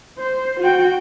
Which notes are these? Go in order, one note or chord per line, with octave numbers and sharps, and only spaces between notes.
C5
F#4 G5